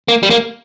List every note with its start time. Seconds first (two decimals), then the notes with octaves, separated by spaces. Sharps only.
0.08 A#3
0.23 G3
0.30 A#3